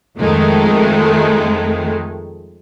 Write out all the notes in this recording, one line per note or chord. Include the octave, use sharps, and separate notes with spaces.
F2 D#3 G#3 A3